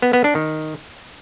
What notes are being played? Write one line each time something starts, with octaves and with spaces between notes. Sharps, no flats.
B3
B3
D4
D#3